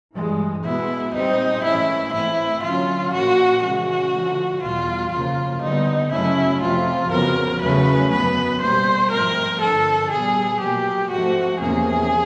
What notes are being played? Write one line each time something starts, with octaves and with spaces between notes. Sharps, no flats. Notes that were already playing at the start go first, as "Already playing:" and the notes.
G2 E3 G#3
B2 G#3 B3 E4
A#2 G3 C4 D#4
G#2 E3 A3 C#4 E4
G#2 E3 A3 C4 E4
D3 F#3 A#3 C#4 F4
A#2 F3 A#3 C#4 F#4
C#3 E3 G#3 C#4 F#4
D3 F3 A3
E2 B2 G3 F4
F#2 C#3 F3 A#3 F4
D3 G3 B3 D#4
F#2 C#3 F#3 A3 C#4 E4
F2 C3 F3 F4
F2 C#3 F#3 B3 A#4
E2 C#3 F#3 A3 C#4 B4
F#2 D3 F#3 B3 B4
B2 G3 A#3 C5
G#2 F3 A3 C4 A#4
G2 D3 F3 A4
A#2 G3 B3 G#4
B2 F#3 A#3 G4
G#2 F3 A3 C4 F#4
E2 C3 F3 A#3 C#4 G#4